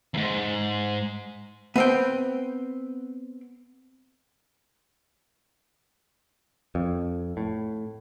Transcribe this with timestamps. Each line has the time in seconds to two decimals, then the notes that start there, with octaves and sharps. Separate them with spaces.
0.14 E2 G#2
1.76 B3 C4 G5
6.75 F2
7.37 A2